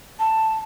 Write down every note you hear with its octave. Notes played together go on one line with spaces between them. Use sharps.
A5